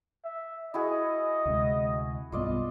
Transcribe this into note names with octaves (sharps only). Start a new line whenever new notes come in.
E5
E4 F#4 G#4 D#5
D2 C3 G#3
B1 G2 B3 F4 D5 D#5